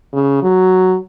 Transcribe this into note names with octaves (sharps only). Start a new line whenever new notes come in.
C#3
F#3